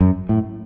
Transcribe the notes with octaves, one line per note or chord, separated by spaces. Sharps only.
F#2
A2